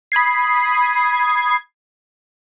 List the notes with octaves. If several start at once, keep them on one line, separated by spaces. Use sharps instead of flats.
B5 D#6 G#6 C7